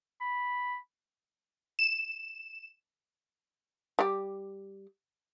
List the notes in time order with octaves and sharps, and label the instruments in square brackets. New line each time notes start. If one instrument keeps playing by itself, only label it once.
[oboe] B5
[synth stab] E7
[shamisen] G3 G4